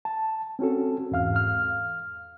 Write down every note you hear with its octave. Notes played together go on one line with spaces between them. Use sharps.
A5
C4 C#4 F#4 A4
E2 G#2 F5 F6
F6